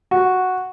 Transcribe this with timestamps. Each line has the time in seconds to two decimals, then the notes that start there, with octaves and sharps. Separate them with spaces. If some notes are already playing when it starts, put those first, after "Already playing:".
0.11 F#4